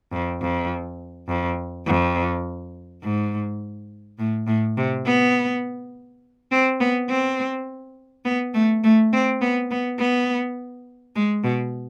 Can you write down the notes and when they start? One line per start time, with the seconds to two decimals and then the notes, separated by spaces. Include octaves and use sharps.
0.12 F2
0.42 F2
1.28 F2
1.86 F2
3.02 G#2
4.19 A2
4.47 A2
4.77 C3
5.06 B3
6.51 C4
6.80 B3
7.09 C4
8.25 B3
8.54 A3
8.84 A3
9.12 C4
9.41 B3
9.71 B3
9.99 B3
11.15 G#3
11.44 B2